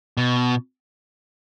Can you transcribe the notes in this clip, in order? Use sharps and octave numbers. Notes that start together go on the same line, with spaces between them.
B2